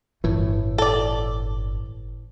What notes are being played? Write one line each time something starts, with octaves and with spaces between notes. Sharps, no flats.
G1 A2 E3
A4 D5